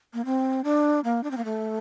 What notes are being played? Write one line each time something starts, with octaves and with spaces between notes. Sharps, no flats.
A#3
C4
D4
A#3
D4
C4
A#3
A3